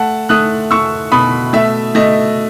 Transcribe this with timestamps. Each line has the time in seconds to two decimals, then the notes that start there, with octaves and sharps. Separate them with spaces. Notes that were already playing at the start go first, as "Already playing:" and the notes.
Already playing: A3 F#5 A5
0.29 A3 D#6 F#6
0.71 A3 C#6 E6
1.12 B2 B5 D#6
1.53 A3 E5
1.95 A3 D#5